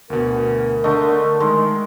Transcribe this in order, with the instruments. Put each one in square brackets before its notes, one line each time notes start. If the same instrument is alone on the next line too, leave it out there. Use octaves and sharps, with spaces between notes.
[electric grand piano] D2 B2 [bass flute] A#4
[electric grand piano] D3 D#5 [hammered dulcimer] A3
[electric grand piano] D#3 [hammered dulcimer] G#3